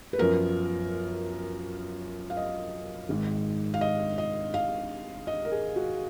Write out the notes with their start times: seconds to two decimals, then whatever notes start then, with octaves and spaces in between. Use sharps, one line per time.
0.13 B4
0.18 F#2 F3 B3 A#4
2.30 F5
2.37 D#5
3.09 G#1 G#2 D#3
3.74 F5
3.81 D#5
4.18 D#5
4.54 F5
5.27 D#5
5.45 A#4
5.52 G#4
5.76 F#4